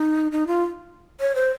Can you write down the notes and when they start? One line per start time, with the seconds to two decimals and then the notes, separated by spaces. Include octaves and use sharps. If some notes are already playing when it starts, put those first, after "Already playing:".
Already playing: D#4
0.32 D#4
0.47 F4
1.20 C#5
1.35 C5